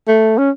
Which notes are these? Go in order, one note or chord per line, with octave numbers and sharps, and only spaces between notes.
A3
C#4